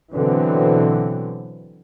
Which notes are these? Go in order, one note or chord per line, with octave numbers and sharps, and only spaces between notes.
B2 D3 E3 F#3 C4